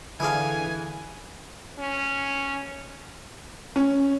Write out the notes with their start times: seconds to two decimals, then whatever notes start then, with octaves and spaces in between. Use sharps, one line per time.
0.20 D3 E3 E4 G#4 F5 G#5
1.79 C#4
3.76 C#4